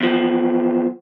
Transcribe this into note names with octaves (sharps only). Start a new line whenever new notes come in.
E2 F3